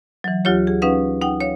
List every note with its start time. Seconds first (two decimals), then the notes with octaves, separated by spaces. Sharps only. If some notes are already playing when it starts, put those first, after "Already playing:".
0.24 E3 F#3
0.45 D2 F#3 F4 G4 C#5
0.67 G#4
0.82 C#4 D#4 B4 F5 F#5
1.21 D#4 F#5 G5
1.41 C#5 F5